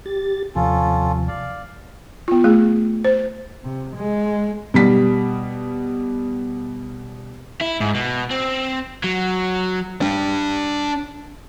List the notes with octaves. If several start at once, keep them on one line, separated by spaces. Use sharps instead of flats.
G4 A6
D#2 C3 F3 C#4 F4 A4
D5 F5
B3 F4
A3 G#4
C5
C3
G#3
B2 G3 B6
E4
G#2
B2
C4
F#3
D4 G5